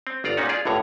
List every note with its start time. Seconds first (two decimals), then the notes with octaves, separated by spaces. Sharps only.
0.07 C4
0.24 G1 F4 D5 A#5
0.37 A#2 C#4 D#4 F#4
0.49 F4 G#4 D5
0.65 G1 C#2 A2 D3 C#5 A#5